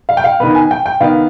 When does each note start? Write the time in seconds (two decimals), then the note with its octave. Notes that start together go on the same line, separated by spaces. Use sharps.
0.09 F5
0.17 G5
0.24 F5
0.40 D#3 B3 B4
0.55 G#5
0.71 G5
0.86 G5
1.00 D#3 B3 F5